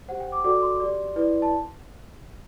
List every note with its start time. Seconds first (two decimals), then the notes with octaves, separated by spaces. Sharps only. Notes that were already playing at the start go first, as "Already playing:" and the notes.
0.08 G4 C5 F#5
0.20 G5
0.32 D6
0.44 F#4 A4 D5 D6
0.62 C6
0.80 G4 D5
1.16 E4 B4 D5
1.42 A5